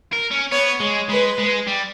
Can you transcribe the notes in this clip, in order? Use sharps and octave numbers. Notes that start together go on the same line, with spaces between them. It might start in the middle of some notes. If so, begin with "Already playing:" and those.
A#4
C#4
B3 C#5
G#3
G#3 B4
G#3
G3